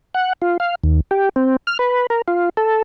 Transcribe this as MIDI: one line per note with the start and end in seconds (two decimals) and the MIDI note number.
0.14 0.33 78
0.42 0.57 65
0.60 0.75 77
0.84 1.00 39
1.11 1.29 67
1.36 1.56 60
1.67 1.78 89
1.79 2.07 71
2.10 2.22 70
2.28 2.49 65
2.57 2.82 69